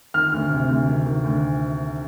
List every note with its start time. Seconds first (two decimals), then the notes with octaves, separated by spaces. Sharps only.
0.14 D#3 F6
0.33 D2
0.51 C3
0.69 D2
0.88 D#3
1.06 D#3
1.24 D2